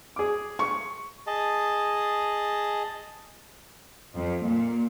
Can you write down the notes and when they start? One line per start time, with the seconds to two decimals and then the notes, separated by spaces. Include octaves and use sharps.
0.16 G#4 D6
0.59 C#6
1.27 G#4 D#5 A5
4.14 F2
4.45 A#2